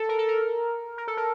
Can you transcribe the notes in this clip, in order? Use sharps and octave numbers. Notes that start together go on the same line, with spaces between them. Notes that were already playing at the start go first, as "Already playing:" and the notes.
Already playing: A4
A#4
A4
A#4
A#4
A4
A#4